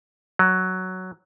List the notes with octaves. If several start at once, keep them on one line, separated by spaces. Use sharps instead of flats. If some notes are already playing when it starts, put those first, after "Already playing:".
F#3